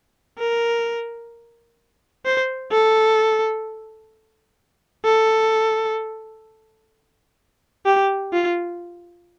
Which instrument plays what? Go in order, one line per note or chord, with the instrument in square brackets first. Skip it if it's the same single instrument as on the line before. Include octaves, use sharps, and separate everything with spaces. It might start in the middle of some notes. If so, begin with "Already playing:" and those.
[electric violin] A#4
C5
A4
A4
G4
F4